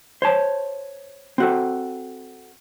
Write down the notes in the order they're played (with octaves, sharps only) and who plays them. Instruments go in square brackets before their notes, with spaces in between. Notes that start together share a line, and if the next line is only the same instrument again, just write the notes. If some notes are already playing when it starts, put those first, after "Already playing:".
[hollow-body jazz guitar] C5 C#5 A5
C4 F#4 A4